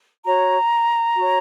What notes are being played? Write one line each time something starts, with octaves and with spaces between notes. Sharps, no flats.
F#4 C#5 A#5
F#4 C#5